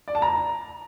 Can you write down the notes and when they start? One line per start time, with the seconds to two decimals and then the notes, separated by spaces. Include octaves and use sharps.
0.08 D5
0.15 A5
0.22 A#5